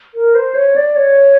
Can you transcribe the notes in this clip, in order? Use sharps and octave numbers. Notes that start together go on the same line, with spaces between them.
A#4
C5
C#5
D5
C#5